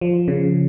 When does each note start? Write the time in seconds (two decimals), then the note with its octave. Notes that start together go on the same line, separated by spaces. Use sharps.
0.01 F3
0.28 C#3